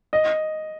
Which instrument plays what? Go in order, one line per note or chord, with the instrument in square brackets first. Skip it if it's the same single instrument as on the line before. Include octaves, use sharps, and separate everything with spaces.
[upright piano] D#5